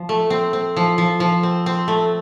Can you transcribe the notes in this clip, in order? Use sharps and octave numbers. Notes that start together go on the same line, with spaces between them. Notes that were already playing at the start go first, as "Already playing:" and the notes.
Already playing: F3
A3
C4
C4
F3
F3
F3
C4
C4
A3